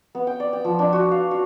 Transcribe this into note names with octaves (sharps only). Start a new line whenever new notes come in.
B3
G5
D5
G5
F3
D4
F#4
F5
F#4